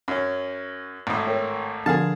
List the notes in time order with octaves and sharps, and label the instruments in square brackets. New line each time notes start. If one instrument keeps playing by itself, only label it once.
[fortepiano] F#2 C#4
G#1 A2
[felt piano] A#4 C#5 G5
[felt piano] D3 F3 A#4 [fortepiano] G#4 F5 A5